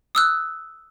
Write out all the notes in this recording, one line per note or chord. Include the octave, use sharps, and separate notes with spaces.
D#6 E6 F#6